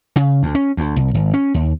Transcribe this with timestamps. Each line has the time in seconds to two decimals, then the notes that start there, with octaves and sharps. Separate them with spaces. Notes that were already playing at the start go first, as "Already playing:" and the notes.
0.16 C#3
0.43 D2
0.55 C#4
0.77 D2
0.96 C2
1.14 G#1
1.34 C#4
1.54 D#2